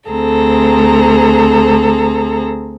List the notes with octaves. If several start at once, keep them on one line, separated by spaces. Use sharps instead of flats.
D2 C4 G#4 A4 A#5